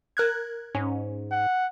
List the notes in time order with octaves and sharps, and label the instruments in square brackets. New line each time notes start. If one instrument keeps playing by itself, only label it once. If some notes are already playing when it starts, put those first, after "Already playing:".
[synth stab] A#4 F#6 G#6
[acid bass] G#2 [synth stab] C#4
[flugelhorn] F#5